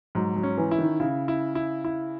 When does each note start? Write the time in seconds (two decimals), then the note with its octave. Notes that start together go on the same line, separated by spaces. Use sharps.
0.15 G#2 F#3
0.36 F#3
0.43 C#4
0.58 E3
0.71 E4
0.79 D#3
1.00 C#3 E4
1.28 E4
1.55 E4
1.84 E4